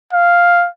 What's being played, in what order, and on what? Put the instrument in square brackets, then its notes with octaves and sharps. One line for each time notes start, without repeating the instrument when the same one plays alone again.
[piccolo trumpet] F5